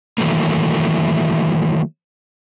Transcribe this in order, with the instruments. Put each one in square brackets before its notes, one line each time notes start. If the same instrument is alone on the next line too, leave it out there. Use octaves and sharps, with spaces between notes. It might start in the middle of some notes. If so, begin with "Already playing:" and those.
[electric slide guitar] D#3 E3 F#3 A3 A#3